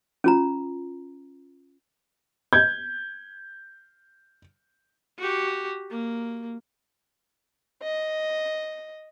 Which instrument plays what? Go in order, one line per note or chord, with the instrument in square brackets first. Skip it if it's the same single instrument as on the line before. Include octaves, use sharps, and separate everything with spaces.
[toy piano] C#4 F4 A#5
[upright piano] G6 G#6
[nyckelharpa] F#4 G4
A#3
[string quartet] D#5